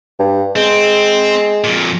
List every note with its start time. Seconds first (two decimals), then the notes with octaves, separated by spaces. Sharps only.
0.19 G2
0.56 G#3 C4
1.64 F2 A#2